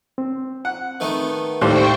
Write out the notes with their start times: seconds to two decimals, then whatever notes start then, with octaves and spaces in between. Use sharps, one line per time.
0.18 C4
0.65 F#5
1.00 D#3 A3 B3
1.61 D#2 A2 C3 G3 C5 G5 C6 C#6